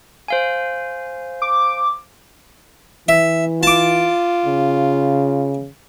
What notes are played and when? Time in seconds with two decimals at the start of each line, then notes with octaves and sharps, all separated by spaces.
0.28 C5 F5 G#5
1.42 D6
3.08 E3 E5
3.63 F4 A5 D6
4.45 C#3